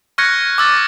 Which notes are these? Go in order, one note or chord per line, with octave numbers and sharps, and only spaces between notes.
C#6 F6 F#6 G#6 A#6 C#7
D6 E6 A6